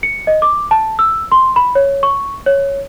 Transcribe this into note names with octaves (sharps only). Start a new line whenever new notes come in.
C#7
D#5
D6
A5
E6
C6
B5
C#5
C#6
C#5